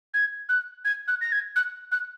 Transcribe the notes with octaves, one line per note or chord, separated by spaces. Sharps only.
G#6
F#6
G#6
F#6
A#6
G#6
F#6
F#6